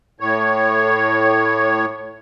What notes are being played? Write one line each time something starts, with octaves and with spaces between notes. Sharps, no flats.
A2 C#5